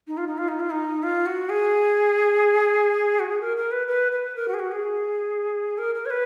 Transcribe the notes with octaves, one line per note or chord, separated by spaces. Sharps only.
D#4
F4
D#4
F4
D#4
F4
D#4
F4
F#4
G#4
F#4
G#4
A#4
A#4
B4
B4
B4
A#4
F#4
G#4
F#4
G#4
A#4
A#4
C#5
B4